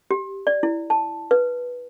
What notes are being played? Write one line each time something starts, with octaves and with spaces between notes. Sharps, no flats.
G4
D5
E4
A5
B4